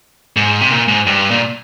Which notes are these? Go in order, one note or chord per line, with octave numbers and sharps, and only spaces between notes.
G#2
C3
A#2
G#2
G2
A#2